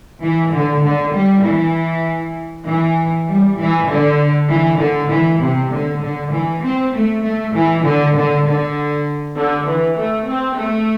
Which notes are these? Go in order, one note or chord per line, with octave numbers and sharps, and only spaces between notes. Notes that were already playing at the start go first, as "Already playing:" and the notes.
E3
D3
D3
G3
E3
E3
G3
E3
D3
E3
D3
E3
C3
D3
D3
E3
C4
A3
A3
E3
D3
D3
D3
D3
E3
A3
C4
A3